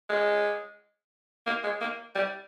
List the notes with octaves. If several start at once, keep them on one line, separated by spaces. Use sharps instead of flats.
G#3
A#3
G#3
A#3
G3